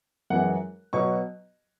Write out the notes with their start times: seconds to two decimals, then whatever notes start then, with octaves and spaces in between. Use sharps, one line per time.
0.30 F#2 E3 G#3 F#5
0.93 B2 F#3 B3 C#6